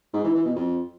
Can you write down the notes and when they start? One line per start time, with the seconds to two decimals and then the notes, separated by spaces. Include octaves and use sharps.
0.13 G#2
0.24 E3
0.34 E3
0.45 B2
0.56 F2